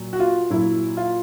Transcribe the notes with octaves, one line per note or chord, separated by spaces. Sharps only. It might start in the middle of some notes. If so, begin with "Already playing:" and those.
Already playing: A#2 F#3
F#4
F4
A#2 F#3 E4
F4